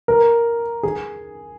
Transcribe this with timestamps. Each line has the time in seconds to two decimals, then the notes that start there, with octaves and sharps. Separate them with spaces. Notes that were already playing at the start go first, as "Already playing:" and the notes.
0.08 A#4
0.83 G#4